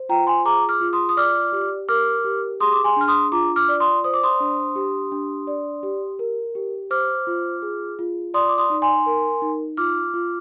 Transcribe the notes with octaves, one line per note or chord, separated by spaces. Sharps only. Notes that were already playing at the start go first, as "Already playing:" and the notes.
Already playing: C5
F4 G5 A#5
G#5 C6
G#4 A#5 D6
D6 F6
F4
C6 D#6
D#6
D5 D6 F6
G4
A#4 D6 F6
G4
G#4 C6 D#6
D6
G#5 C6
D4 F6
C6 D#6
F4 A#5 D6
D6 F6
D5
C6 D#6
C5 D#6
D6
C6 D#6
D4
G4
D4
D5
G4
A#4
G4
C5 D6 F6
F4
G#4
F4
D5 C6 D#6
D6
C6 D#6
D#4
G#5 C6
A#4
D#4
F4 D6 F6
F4